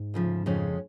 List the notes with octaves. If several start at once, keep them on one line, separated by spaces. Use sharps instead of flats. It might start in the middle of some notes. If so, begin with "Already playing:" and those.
Already playing: G#2
D2 C#3 F3
F2 C#3 F3 G#3 C#4